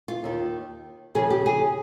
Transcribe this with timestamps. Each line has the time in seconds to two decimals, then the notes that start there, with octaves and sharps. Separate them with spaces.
0.08 F4
0.24 D#2 D#3
1.15 D#2 C#3 F3 G#4
1.30 G4
1.46 G#4